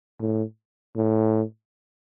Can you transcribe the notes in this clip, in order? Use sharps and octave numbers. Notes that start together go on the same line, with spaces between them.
A2
A2